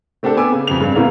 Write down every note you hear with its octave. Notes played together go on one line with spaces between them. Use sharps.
A3 C4 D4 G4 A4
B3 G#5 D6 E6
C#3
F2 C3 F7
G2 C#3
A2 C#3 A#3 B3